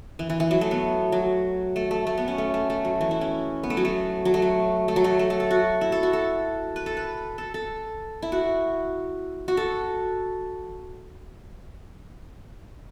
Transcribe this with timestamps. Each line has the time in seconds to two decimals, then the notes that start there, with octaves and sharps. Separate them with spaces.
0.19 E3
0.30 E3
0.40 E3
0.51 F#3
0.61 A3
0.71 B3
1.12 F#3
1.76 A3
1.91 A3
2.07 A3
2.18 B3
2.28 C#4
2.38 A3
2.54 A3
2.70 A3
2.85 F#3
3.01 E3
3.11 E4
3.21 C#4
3.63 B3
3.70 A3
3.77 F#3
3.85 A3
4.25 F#3
4.34 A3
4.42 F#3
4.88 A3
4.96 F#3
5.04 A3
5.19 A3
5.30 A3
5.40 A4
5.51 F#4
5.81 E4
5.92 A4
6.03 F#4
6.13 A4
6.76 B4
6.86 A4
6.97 B4
7.38 A4
7.54 A4
8.22 E4
8.32 F#4
9.48 F#4
9.57 A4